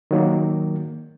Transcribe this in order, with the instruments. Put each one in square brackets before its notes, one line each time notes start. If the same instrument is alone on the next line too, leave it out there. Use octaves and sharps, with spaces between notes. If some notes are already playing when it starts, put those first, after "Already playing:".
[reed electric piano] D#3 F#3 A#3